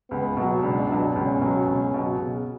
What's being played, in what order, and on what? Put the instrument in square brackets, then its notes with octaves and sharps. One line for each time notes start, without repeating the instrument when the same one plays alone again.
[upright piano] C#2 [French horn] B3
[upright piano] B2 F#3
[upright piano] C#2 [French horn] D4
[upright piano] B2 F#3
[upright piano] C#2 [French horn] C#4
[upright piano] B2 F#3
C#2
B2 F#3
C#3